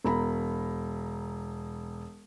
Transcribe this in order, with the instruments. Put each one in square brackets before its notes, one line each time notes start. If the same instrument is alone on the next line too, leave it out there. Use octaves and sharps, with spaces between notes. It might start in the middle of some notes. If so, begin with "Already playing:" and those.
[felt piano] E1 A#5 B5